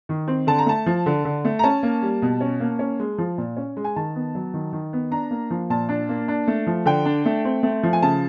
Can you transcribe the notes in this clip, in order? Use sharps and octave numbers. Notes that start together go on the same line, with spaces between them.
D#3
C4
D3 A5
A#5
A3 A5
F3
D3
D3
A3
A#5
C#4 A5
A#3
G3
B2
C#4
A#3
C#4
G#3
F3
A#2
C#4
G#3
G#5
D#3 A5
B3
F#3
D#3
D#3
B3
D4 A#5
A#3
F3
A#2 A5
D4
A#3
D4
A3
F3
D3 G5
D4
A3
C4
A3
F3
G#5
C#3 A5